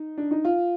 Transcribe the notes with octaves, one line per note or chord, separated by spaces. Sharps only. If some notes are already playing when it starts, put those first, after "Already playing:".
Already playing: D#4
D4
D#4
F4